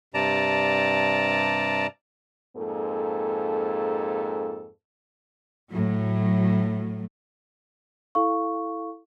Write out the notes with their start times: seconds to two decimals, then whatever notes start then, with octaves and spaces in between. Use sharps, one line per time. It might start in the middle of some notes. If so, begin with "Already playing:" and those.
0.14 G2 C3 D5 A5 A#5
2.57 F2 G#2 A#3 G#4 A4
5.72 A2 F#3
8.15 E4 A4 F5 C#6